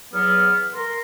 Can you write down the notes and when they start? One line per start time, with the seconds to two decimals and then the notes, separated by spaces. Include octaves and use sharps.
0.13 E2 F#3 B3 F6
0.74 A#4 C6